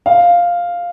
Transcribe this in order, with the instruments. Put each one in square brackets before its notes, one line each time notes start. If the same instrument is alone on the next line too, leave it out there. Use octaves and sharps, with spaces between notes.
[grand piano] F5